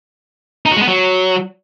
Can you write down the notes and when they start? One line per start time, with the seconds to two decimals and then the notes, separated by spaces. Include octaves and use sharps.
0.66 D#4
0.71 F#4
0.77 G#3
0.82 B3
0.88 F#3